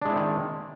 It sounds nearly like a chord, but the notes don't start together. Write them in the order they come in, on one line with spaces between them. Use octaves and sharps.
D4 G#3 E4 C4 D#3